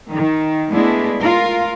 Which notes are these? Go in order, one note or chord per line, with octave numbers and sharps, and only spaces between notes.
D#3
G#3 A3 B3 D4 E4
F4 A#4